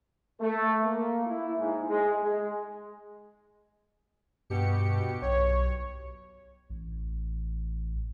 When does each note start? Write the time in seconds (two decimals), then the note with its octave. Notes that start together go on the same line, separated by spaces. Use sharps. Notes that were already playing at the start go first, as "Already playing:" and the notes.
0.40 A3
0.83 A#3
1.27 E4
1.58 G#2
1.89 G#3
2.22 G#3
4.50 G2 B2 G4 C#7
5.22 B1 C#5
6.70 A1